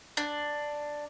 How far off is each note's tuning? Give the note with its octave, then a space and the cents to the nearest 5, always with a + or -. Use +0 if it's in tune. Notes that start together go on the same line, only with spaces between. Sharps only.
D4 +5